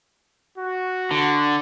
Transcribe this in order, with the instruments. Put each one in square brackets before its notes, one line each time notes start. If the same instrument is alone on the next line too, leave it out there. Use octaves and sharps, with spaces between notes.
[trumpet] F#4
[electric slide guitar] D3